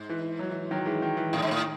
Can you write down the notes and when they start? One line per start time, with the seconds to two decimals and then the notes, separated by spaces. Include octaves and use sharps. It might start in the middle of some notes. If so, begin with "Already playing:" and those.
Already playing: G#2
0.09 E3
0.39 F#3
0.51 E3
0.71 D#3 F#3
0.86 E3 G#3
1.02 D#3
1.17 E3
1.33 A2 D#3
1.42 G#2
1.51 A2